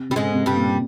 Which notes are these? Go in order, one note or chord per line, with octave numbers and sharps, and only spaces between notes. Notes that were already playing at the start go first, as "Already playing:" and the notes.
Already playing: C3
C#3 G3
G#2 G#3
C3
G2 G3
A#2